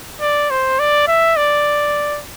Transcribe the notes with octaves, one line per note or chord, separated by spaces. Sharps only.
D5
C5
D5
E5
D5